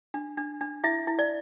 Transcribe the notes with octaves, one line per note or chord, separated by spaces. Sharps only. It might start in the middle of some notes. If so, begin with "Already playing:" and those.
D4
D4
D4
E4 E5
E4
D5